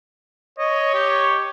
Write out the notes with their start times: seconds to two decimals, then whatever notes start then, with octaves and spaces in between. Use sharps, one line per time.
0.59 C#5 D#5
0.94 G4